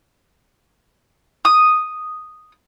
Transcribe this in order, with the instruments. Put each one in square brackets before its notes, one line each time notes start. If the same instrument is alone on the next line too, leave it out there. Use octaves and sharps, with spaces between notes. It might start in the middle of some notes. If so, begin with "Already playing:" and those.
[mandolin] D#6